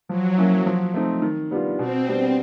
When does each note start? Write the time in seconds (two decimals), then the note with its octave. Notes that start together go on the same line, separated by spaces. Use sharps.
0.09 F3 F#3
0.38 A#3 C#4 E4
0.66 F3
0.94 A3 C4 D#4
1.22 D#3
1.51 G3 B3 D4 F4
1.79 B2 C4
2.08 G3 B3 D4